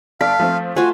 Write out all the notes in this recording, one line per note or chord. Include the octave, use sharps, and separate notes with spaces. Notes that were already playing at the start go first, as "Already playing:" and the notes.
G1 A4 D5 F5 B6
F3 A3 C4
A3 F4 F#4 C5 G#5